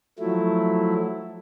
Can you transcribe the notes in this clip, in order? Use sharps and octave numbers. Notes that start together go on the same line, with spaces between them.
F3 F#3 A3 E4